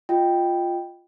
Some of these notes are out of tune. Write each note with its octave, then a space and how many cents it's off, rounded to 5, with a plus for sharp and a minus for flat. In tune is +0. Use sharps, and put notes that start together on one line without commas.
F4 +5 D#5 +0 G5 +0